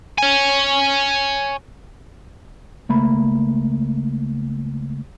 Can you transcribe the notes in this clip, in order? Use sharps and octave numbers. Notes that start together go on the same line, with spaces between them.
C#5 G#5
C#2 A3 A#3 B5